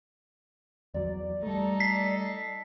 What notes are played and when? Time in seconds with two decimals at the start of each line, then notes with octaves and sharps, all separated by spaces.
0.94 E2 F#3 D5
1.43 G3 A3 D#4 A4
1.80 B6 C7